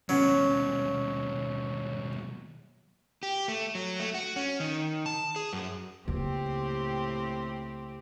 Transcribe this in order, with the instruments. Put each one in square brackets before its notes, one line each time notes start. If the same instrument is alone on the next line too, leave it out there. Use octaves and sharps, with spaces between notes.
[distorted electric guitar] D#2 B2 [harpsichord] F#3 [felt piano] C#4
[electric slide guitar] G4
A3
F#3
A3
F#4
C#4
D#3
A5
G#4
F#2
[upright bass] C#2 A#3 [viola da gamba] A2 C4 G4